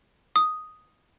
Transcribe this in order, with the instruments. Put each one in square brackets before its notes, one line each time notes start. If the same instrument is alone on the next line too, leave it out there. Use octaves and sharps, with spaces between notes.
[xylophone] D#6